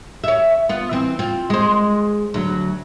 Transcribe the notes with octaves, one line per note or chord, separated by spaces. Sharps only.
C#5 E5
B3 F4
E3 C4
C4 F4
G#3 C5
D2 F#3